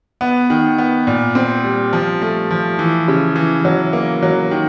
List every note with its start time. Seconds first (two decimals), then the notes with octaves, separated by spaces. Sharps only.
0.21 B3
0.50 D#3
0.78 B3
1.07 A#2
1.35 C4
1.64 G3
1.93 F3
2.22 A3
2.51 F3
2.79 E3
3.08 C#3
3.36 E3
3.65 F#3
3.93 A#3
4.23 F#3
4.51 D#3